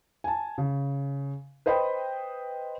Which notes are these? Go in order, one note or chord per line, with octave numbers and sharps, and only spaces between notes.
G#5 A5
C#3
B4 C5 D#5 G5 B5